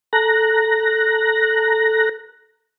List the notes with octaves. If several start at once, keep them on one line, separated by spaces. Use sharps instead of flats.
A4 A#5 F#6 A#6